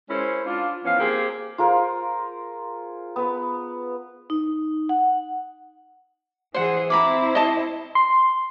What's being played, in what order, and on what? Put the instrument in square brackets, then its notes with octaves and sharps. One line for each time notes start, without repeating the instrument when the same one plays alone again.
[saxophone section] G#3 C#4 E4 A#4 C5
D4 F4
E3 F3 B3 C#4 F5
A#3 C4 G4 G#4
[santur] F4 G#4 A#4 C5
B3 B4
[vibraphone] D#4
F#5
[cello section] E3 G#4 [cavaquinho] C5 F#5
[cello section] C4 E4 [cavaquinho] A#5 B5 D6
[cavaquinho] D#5 A5
[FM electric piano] C6